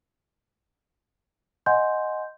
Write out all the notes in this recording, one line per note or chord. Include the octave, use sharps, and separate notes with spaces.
D#5 F#5 G#5 C6 G6